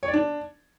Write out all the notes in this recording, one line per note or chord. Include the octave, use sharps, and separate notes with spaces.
C#5
D5
D4